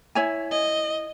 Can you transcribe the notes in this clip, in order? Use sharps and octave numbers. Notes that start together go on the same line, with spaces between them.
E4 C#5 G#5
D#5